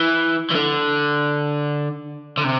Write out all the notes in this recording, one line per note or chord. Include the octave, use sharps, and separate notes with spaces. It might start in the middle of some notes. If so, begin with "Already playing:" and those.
Already playing: E3
E3
D3
D3
C3